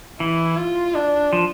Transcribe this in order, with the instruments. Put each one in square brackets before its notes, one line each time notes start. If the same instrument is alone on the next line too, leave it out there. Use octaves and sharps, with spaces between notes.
[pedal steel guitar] E3 [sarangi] E4
[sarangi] F4
D4
[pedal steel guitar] F3